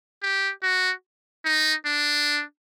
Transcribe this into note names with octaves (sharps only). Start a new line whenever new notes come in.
G4
F#4
D#4
D4